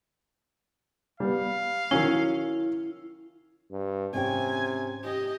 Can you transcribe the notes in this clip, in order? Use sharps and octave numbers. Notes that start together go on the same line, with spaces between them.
G3 B3 F5
D#3 F#3 C#4 E4
G2
G#2 C3 C#4 G5 G#5
G4 D#5